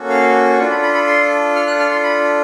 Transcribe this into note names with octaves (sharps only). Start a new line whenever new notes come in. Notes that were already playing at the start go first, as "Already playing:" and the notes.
Already playing: A#3 C#4 F#4 A4
F5
D4 F4 A4 F#5
B5
B5
B5
C6
F6
F#6
F6
C6
B5